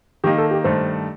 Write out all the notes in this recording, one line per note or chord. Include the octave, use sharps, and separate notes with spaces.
D#3 A#3 D#4 G4
A4
G4
G2 D#3 A3 C5